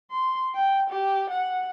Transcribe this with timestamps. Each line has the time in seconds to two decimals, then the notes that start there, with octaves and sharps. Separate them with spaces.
0.11 C6
0.55 G5
0.90 G4
1.30 F#5